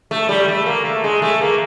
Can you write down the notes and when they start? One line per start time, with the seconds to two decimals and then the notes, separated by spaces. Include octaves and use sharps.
0.11 A3
0.29 G3
0.48 A3
0.66 A#3
0.85 A3
1.04 G#3
1.22 A3
1.41 A#3